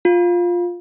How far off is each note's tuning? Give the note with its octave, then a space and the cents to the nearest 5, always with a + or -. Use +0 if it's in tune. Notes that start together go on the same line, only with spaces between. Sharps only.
F4 +5